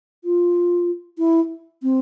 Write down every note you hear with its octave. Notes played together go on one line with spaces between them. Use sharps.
F4
E4
C4